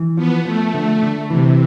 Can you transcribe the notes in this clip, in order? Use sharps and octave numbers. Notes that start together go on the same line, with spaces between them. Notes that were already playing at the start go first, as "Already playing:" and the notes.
Already playing: E3
F3 B3
F3 A3
D3
D3
C3 E3